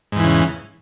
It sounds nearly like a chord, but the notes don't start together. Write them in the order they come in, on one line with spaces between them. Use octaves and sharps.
G#2 E2 E3 C#3